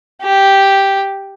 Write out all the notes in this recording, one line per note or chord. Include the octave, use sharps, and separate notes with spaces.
G4